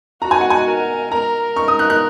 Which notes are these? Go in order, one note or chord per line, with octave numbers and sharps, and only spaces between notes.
F#4 A#5
G#5
F#5
G#5
A#4
A#4 A#5
C#6
D#6
F#6
F#6